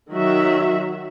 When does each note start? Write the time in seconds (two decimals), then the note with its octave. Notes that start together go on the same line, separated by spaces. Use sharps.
0.12 D#3 F#3 F#4 E5